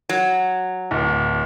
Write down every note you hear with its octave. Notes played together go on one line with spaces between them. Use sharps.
F#3
D1